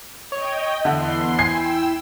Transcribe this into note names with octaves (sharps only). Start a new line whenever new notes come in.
C#5 D#5 G5
E2 D3 E4 C6
G5 G#5 E6 G#6 C7